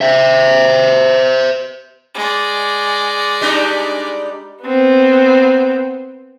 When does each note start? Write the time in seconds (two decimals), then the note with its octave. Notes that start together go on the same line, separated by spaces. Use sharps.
0.01 C5 E5
2.15 G#3 D5
3.41 G3 D4 D#4
4.64 B3 C4